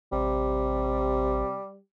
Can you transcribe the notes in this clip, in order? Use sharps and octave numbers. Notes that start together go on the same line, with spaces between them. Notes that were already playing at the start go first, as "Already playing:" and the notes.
A1 C3 G3